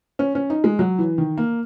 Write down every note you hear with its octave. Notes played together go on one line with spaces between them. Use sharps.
C#4
C#4
D#4
G#3
F#3
E3
D#3
A#3